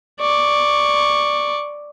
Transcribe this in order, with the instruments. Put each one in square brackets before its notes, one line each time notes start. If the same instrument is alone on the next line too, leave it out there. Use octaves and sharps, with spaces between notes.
[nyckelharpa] D5 C#6